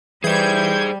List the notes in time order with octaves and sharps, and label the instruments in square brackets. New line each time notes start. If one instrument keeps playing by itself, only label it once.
[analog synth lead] E3 [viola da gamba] G3 [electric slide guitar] G#4 C5 [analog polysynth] G6 G#6